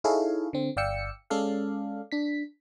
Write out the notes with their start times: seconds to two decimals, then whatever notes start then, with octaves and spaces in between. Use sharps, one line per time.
0.04 D#4 E4 G#4 A4 C#5 F5
0.53 D3 C4
0.77 G1 D5 F5 G5 E6 C#7
1.30 G#3 C#4 A4 D5 F5
2.12 D4 B6